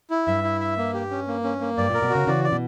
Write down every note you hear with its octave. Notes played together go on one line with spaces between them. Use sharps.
E4
G2 E5
E4
E5
A#3
G4
C#4
A#3
C#4
A#3
G2 D5
A#2 A#4
B2
C#3 F#4
C#3 E3 D5
D5
B2